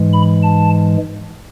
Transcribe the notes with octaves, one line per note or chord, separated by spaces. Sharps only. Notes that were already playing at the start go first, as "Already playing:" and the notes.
Already playing: G#2 E3 G#3
B5
A5